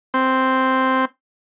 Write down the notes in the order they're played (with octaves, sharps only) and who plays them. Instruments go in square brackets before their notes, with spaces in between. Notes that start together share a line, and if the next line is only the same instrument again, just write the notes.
[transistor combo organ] C4